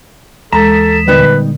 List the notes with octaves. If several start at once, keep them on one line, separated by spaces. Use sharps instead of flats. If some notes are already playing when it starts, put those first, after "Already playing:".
D#2 E3 G#3 A4 A#5
A#2 D3 G3 B3 D#4 B4